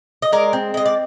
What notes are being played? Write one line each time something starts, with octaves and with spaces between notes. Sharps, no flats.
D#5
G#3 A#4 D5
C4
G#3 D#5
D5